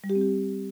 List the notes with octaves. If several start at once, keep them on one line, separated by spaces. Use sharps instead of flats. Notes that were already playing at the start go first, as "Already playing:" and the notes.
G3
G4
C4
G4